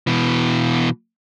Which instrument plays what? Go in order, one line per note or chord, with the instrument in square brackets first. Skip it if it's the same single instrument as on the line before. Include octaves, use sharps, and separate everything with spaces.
[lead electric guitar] B2 E3